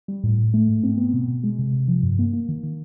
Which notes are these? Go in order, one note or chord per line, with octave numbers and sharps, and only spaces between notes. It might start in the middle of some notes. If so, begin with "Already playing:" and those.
G3
A2
A2
A3
G#2
C4
B3
B2
B2
G#3
C3
C3
F3
G2
A#3
A#3
D#3
D#3